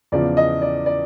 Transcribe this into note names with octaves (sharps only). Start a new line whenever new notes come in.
E2 C#3 F3 D5
D#5
D5
D5